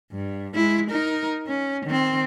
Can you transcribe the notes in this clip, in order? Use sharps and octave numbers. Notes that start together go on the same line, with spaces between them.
G2
G#3 E4
D#4 A#4
C#4
D#3 C4